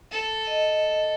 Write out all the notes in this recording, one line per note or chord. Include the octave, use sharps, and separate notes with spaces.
A4
D#5